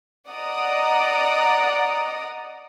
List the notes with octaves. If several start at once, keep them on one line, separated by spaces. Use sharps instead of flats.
D5 D#5 F#5 A#5 D#6